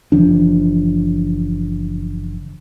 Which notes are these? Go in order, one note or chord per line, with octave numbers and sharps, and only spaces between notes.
F#1 E3 F3 D4